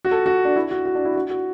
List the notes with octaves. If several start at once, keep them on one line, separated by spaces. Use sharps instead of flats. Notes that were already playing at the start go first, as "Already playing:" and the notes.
F#4
A4
F#4
D4
E4
F#4
F#4
D4
E4
F#4
F#4